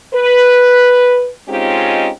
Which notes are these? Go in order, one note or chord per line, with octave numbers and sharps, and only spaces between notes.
B4
G#3 C4 C#4 D#4 F4 G4